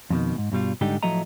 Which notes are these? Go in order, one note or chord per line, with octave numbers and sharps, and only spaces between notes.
F2 B2 D#3
D2 G#2
G2 B2 G3 F4
G#2 D3 G3 D#4 G4
A2 F3 F#3 A3 D#5 A#5